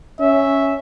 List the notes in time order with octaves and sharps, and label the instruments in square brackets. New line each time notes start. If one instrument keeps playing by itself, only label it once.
[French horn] C#4 [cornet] E5